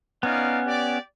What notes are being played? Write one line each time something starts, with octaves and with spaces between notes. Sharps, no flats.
B3 C#4 D#4 D5 F5
G4 D5